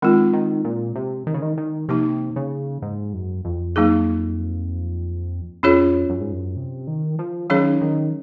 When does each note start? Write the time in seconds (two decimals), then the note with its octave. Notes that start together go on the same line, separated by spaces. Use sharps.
0.02 D#3 G#3 C4 F4
0.33 D#3
0.64 A#2
0.95 C3
1.27 D#3
1.34 C#3
1.42 D#3
1.58 D#3
1.88 C3 F3 A#3 D#4
2.36 C#3
2.82 G#2
3.13 F#2
3.45 F2
3.76 F#3 A#3 D#4 G#4
5.63 F2 C#4 F4 G#4 C#5
6.10 F#2
6.21 G#2
6.32 F#2
6.57 C3
6.87 D#3
7.19 F3
7.50 D#3 F#3 C#4 G#4 C#5
7.82 D#3